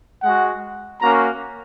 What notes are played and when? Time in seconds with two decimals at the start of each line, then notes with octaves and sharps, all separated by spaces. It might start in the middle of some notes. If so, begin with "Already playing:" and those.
0.23 G#3 F#4 F#5
1.02 A#3 C#4 F#4 A#5